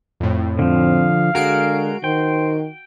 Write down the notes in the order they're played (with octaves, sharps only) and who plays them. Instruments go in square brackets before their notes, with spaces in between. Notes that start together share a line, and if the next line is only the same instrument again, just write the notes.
[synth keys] F2 A2
[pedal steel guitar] D3 F3 [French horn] C4 [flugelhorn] F5
[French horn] D3 [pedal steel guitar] G#3 G#4 A#4 [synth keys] F#4 C7 D7
[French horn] D#3 [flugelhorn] C5 [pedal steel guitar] G5